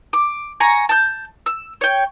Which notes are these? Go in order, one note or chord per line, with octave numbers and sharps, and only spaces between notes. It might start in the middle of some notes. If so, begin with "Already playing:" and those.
D6
G#5 A#5 C#6
A5 G6
E6
C#5 G5